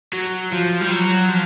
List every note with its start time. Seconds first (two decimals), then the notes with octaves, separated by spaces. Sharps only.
0.13 F#3
0.52 F3
0.81 G3
0.91 F#3
1.29 F3